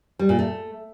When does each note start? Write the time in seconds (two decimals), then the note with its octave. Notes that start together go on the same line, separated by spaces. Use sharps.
0.19 G3
0.29 A#2
0.39 A3